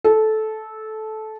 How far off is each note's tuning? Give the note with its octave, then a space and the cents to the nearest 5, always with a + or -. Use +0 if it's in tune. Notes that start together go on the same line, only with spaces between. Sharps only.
A4 -15